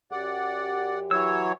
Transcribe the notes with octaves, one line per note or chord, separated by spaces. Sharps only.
F#2 G4 D5 F#5
E3 F#3 C#5 E6